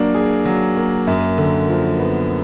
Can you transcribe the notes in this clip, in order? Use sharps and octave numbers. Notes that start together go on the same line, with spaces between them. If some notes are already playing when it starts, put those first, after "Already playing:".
Already playing: F#3 A#3 D4
G#4
F#3
A#3
F#2
D3
F3
B3